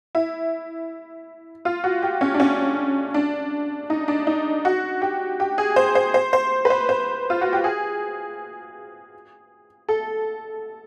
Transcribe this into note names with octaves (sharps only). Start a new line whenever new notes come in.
E4
F4
F#4
G4
C#4
D4
C#4
D4
D#4
D4
D#4
F#4
G4
G4
G#4
C5
C5
C5
C5
B4
C5
C5
F4
F#4
G4
G#4
A4